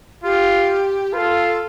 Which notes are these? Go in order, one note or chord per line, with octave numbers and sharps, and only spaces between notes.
F4 G4
F4 A4 B4